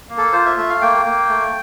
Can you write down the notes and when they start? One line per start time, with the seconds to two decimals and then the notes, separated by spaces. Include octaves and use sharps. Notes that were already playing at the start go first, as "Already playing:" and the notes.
0.09 A#3
0.18 A4
0.33 F4 C5
0.45 E5
0.57 A3 E5
0.70 F5
0.81 A#3 G5
1.05 A#3
1.29 A3